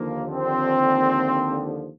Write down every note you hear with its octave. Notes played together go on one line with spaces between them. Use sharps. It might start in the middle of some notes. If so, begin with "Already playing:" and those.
Already playing: D#2 D3 F3 A#3
C4